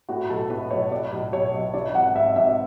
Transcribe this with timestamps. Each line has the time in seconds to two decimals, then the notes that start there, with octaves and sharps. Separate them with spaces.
0.09 A2 F#4
0.29 B1 A4
0.50 A2 B4
0.71 B1 C#5
0.92 A2 D5
1.12 B1
1.32 B1 C#5
1.54 B1
1.74 E3 D5
1.94 G#1 F#5
2.15 G#1 E5
2.36 G#1 E5